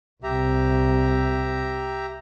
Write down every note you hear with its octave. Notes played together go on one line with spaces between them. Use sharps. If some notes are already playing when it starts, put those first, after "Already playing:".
C2 C3 G4 E5 A#5